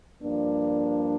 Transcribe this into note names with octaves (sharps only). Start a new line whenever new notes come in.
G2 F3 A#3 D4